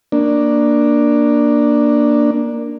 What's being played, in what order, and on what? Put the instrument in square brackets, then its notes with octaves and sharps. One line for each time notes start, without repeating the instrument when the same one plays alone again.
[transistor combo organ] A#3 D4